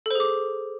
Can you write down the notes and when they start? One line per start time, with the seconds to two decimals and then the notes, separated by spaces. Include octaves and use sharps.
0.06 A4
0.11 C5
0.15 G#4
0.20 D6